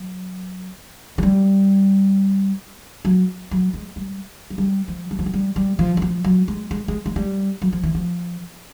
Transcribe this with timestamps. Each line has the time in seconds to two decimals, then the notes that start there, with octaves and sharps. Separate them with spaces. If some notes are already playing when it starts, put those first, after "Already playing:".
Already playing: F#3
1.18 F#3
1.23 G3
3.05 F#3
3.51 F#3
3.74 G#3
3.96 G3
4.50 F#3
4.58 G3
4.88 F3
5.11 G3
5.19 F3
5.26 F#3
5.34 G3
5.56 G3
5.79 F3
5.97 F#3
6.02 F3
6.24 F#3
6.48 G#3
6.71 G#3
6.88 G#3
7.06 G#3
7.16 G3
7.62 F#3
7.73 F3
7.84 E3
7.95 F3